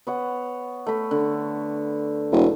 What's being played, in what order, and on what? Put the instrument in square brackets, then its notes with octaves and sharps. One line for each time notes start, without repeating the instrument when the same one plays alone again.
[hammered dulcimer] B3 C#5 F#5
A3 B5
D3
[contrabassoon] E1